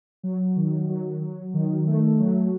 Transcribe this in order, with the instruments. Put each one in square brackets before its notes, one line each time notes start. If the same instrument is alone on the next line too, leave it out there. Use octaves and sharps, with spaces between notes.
[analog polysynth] F#3
D#3
F#3
F#3
D#3
A3
F#3